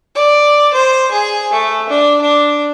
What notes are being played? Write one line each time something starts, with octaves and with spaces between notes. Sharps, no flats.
D5
C5
G#4
A3
D4
D4